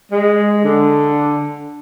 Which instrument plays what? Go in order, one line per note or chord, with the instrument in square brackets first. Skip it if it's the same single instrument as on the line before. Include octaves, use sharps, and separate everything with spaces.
[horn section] G#3
D3